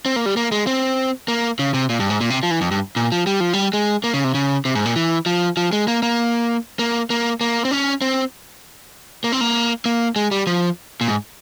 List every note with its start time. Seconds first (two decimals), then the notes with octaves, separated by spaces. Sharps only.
0.06 C4
0.16 A#3
0.26 G3
0.37 A#3
0.52 G#3
0.67 C4
1.28 A#3
1.59 C#3
1.74 C3
1.90 A#2
2.00 G2
2.10 G#2
2.21 A#2
2.30 C3
2.43 F3
2.51 E3
2.61 F2
2.71 G2
2.96 A#2
3.12 F3
3.27 G3
3.40 F3
3.53 G3
3.73 G#3
4.04 A#3
4.13 C#3
4.24 C3
4.34 C#3
4.65 C3
4.75 G#2
4.85 A#2
4.96 E3
5.26 F3
5.57 F3
5.73 G#3
5.88 A#3
6.03 A#3
6.79 A#3
7.10 A#3
7.41 A#3
7.65 C4
7.71 C#4
8.01 C4
9.24 A#3
9.32 C4
9.41 A#3
9.85 A#3
10.16 G#3
10.31 G3
10.47 F3
11.01 A#2
11.08 G#2